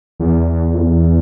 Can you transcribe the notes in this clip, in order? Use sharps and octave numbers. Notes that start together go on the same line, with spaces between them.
E2
F2
E2